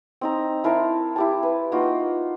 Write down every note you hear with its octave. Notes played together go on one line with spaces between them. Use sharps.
C4 D#4 A#5
E4 A#4 C5 A5
E4 G4 A5
B4
A#3 D#4 F4 F#4